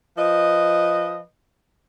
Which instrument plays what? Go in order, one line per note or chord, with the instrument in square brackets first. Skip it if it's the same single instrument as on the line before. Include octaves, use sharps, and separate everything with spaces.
[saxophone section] F3 B4 D#5